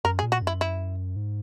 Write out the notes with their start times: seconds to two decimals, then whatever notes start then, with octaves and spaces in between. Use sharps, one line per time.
0.04 F#2 A#4
0.19 G#4
0.23 A#2
0.32 F#4
0.42 F#2
0.47 E4
0.61 E4
1.16 G#2